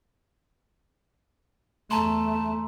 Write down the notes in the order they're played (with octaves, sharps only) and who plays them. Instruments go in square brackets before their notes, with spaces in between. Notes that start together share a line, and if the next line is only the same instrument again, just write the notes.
[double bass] E2 A3 [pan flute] A5 [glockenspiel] A#5 C6